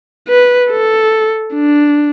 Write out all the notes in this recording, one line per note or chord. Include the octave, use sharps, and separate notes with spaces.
B4
A4
D4